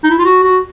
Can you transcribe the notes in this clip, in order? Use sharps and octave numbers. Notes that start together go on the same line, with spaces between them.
D#4
E4
F4
F#4
F#4